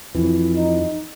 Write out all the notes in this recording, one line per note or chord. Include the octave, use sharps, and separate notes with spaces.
F2 E3
D#4